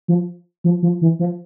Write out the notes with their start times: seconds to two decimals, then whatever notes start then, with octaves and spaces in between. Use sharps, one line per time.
0.08 F3
0.64 F3
0.82 F3
1.01 E3
1.19 F3